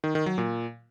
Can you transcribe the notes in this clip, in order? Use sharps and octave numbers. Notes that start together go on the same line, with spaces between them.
D#3
D#3
F#3
A#2